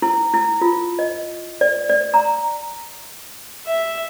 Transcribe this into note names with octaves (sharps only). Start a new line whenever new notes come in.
E4
E4
F4
D#5
D5
D5
A#5
E5